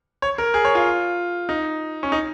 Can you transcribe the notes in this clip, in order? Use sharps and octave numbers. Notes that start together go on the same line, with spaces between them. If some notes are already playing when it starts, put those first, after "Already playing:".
C#5
A#4
G#4
C#5
F4
D#4
C#4
D#4